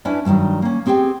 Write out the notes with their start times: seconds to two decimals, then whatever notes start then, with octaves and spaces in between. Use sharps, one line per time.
0.05 C#4 D4 E4 B4 D5
0.25 G2 B2 D3 D#3 F#3
0.62 A#3 C#4
0.86 B3 C4 G4 G#4 G5